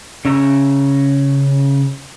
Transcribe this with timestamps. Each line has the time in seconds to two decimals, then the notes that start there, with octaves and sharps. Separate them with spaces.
0.25 C#3 C#4 E5 A#5